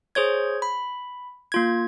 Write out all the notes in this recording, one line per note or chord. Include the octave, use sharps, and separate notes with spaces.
G#4 C5 C#5 G#6
B5
A#3 F4 G#6